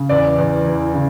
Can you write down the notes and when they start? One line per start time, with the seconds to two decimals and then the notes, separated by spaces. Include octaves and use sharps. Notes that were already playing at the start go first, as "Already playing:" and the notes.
Already playing: C#3
0.09 E2 D5
0.38 E2
0.66 E3
0.94 C#3